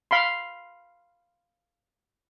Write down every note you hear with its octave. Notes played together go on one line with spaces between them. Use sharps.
F5 B5 C6